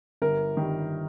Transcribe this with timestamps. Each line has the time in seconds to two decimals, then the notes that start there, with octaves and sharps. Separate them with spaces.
0.22 G1 A#4
0.57 D#3 G3